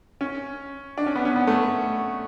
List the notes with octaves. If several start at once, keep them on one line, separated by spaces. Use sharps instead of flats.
C#4
D4
C#4
B3
C#4
B3
A3